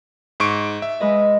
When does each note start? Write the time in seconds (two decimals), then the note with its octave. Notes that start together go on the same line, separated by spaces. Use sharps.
0.40 G#2 C#6 D7
0.82 E5
1.00 G#3 B4 D#5